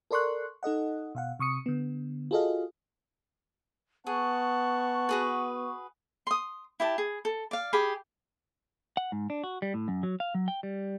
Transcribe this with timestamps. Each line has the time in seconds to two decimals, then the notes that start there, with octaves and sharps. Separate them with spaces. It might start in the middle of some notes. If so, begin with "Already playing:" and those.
0.11 A4 A#4 D5 C6 C#6 F#6
0.63 D#4 A4 D#5 F#5
1.15 B2 F5 F#5
1.39 C3 C#6 D#6 C#7
1.66 D3 B3
2.31 F4 F#4 G#4 A4 D#5 F5
4.07 B3 G#4 F#5 A5 C#6
5.09 F#4 G#4 B4
6.27 C6 D#6
6.80 E4 G4 A5
6.98 G#4
7.25 A4
7.51 D5 F5
7.73 G4 G#4 B5
8.97 F#5
9.12 G#2
9.30 D4
9.44 F#4
9.62 G3
9.74 A2
9.88 F#2
10.03 F#3
10.20 F5
10.35 F#3
10.48 G5
10.63 G3